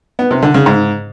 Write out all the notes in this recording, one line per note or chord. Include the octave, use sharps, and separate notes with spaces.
B3
C3
D3
C#3
G#2